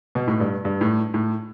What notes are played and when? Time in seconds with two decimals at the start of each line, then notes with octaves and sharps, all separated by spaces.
0.15 B2
0.27 A2
0.40 G2
0.65 G2
0.81 A2
1.14 A2